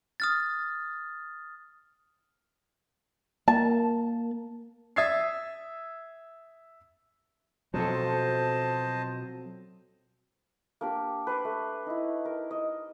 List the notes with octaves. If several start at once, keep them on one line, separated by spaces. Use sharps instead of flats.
D#6 F6 A6
A#3 A5
E5 D#6 E6 G#6 A6 C7
B2 F3 F#3 C4 A4 C5 D#5 A5
A#3 D4 G4
B4 C6 D6
A3
D#4 E4
A#4
D#5